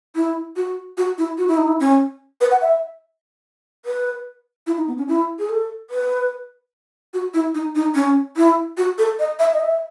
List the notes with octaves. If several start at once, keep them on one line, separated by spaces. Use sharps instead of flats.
E4
F#4
F#4
E4
F#4
E4
D#4
E4
C#4
B4
F#5
E5
B4
E4
D#4
B3
C#4
E4
G#4
A4
B4
F#4
E4
D#4
D#4
C#4
E4
F#4
A4
D#5
E5
D#5
E5